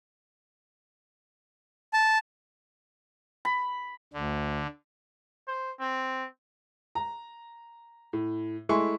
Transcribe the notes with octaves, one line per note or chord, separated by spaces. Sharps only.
A5
B5
D2 D3
C5
C4
A#5
A2
G#3 A3 E4 G#5 C6 C#6